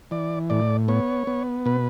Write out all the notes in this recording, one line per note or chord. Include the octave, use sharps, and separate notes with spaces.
E3 D5
A2 D5
B3 C#5
B3
B2 B4